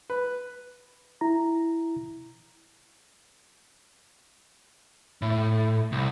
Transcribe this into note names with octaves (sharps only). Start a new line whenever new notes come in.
B4
E4 A#5
A2
C2